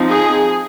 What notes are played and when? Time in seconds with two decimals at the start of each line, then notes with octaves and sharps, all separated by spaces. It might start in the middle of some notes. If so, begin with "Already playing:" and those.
Already playing: F3 C4 D#4
0.10 G#4